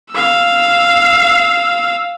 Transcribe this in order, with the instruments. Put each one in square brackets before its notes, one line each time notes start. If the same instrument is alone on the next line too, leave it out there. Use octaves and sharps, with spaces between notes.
[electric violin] F5 E6